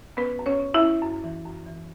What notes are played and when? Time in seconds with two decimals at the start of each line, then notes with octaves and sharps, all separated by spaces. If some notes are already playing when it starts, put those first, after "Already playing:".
0.17 B3 C#4 B4
0.39 F#2
0.46 C#4 C#5
0.60 C#4
0.74 E4 E5
0.82 C#4
1.02 F#2
1.24 E3
1.45 F#2
1.66 E3